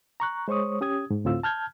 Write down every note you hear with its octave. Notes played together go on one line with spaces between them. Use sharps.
A#5 C#6 F#6
G#3 C5 C#5 C#6 D#6
C#4 G4 D#6 G#6
G#2
D2 A2 C4 F4 E6
A5 F6 G6 G#6